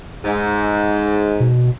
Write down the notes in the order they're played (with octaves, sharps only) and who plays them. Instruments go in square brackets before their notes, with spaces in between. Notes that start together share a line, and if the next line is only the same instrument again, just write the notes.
[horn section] G#2
[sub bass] B2